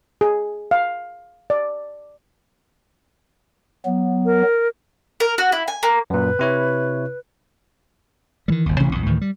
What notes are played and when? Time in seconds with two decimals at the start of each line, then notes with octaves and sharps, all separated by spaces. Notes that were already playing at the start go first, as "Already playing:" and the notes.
0.21 G#4
0.71 F5
1.50 D5
3.86 F#3 B3
4.25 A#4
5.20 A#4
5.38 F#4
5.52 E4
5.68 G#5
5.83 A#3
6.10 F#2 A#2 B4
6.39 C3 E4 C#5
8.48 D#3 E3 G3
8.66 G1 D#2
8.80 A1 C3 E3 C#4
8.93 A#1 E2
9.06 D2 A2 D#3 E3
9.21 G3